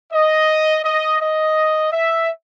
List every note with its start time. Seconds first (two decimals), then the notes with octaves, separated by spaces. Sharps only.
0.12 D#5
0.84 D#5
1.20 D#5
1.91 E5